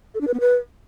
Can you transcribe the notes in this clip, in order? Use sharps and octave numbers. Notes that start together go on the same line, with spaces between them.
A4
D4
B4
B3
B4